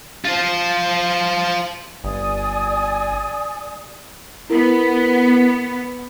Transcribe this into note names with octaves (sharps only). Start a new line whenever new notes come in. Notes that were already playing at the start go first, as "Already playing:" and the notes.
F4 C5
G1 D5 G#5 D#6
B3 E4 A#4